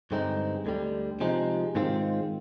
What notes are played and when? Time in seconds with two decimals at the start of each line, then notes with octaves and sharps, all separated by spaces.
0.11 G2 D3 G#3 C4 D#4
0.66 D2 D3 G3
1.20 C3 F3 G#3 D#4
1.75 G#2 D#3 G#3 C4 F4